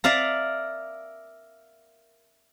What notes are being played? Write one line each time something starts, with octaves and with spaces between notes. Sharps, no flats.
A#4 D5 E5 F5 A#5